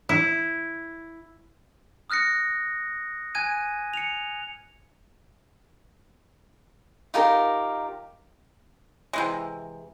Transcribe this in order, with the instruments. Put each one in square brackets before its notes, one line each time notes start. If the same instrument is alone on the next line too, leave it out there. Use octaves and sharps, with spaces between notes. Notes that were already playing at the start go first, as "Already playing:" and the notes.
[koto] E4
[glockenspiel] D#6 F6 F#6 A#6 C#7
G#5 F#6 G#6 D#7
C#7 F7
[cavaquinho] D#4 F4 G4 A#4
[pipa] C3 E3 G#3